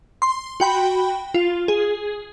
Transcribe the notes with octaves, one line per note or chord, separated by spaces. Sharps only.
C6
F#4 G5 B5
F4
G#4